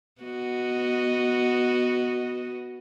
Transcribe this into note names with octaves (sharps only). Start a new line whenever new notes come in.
B3 F#4 D#5